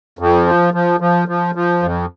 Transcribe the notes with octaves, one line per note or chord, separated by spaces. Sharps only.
F2
F3
F3
F3
F3
F3
F2